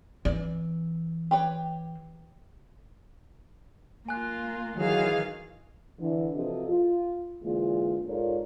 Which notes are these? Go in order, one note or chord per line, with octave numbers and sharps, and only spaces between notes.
E3 C4 D5
G4 B4 C#5
A#3 F4 G#5 F#6
D#3 E3 F#3 G#4 F5
D3 E3
C3 F3 F#4 A4 B4 D#5
F4
A#2 D3 E3 G#3 F4
G#2 F4 A4 A#4 C#5 D5